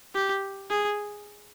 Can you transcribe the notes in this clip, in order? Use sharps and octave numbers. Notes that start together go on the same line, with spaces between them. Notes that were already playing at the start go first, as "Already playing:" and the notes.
G4
G#4